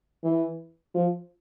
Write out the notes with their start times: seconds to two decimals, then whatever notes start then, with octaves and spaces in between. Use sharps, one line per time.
0.24 E3
0.94 F3